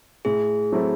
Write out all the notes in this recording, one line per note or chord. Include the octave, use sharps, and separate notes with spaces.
A2 G#4
F#3 A3 C4 E4